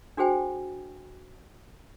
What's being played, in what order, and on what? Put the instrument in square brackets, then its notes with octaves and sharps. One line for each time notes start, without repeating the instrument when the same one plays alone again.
[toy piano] D4 F#4 G#4 C5 G5 G#5